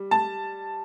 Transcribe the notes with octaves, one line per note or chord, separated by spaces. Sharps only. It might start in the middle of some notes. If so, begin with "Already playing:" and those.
Already playing: G3
A5